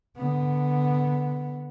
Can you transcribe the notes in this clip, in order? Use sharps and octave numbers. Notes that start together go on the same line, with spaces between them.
D3 B3